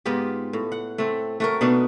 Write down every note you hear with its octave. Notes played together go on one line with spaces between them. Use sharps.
G#2 B3 F4 G4
A2
F#5
A3 C4
A3 F#4 A#4
B2 B3 D4 D#4